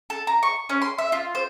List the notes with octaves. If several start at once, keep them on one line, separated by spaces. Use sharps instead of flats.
A4
A#5
C#6
C#4
C6
E5
F4
C5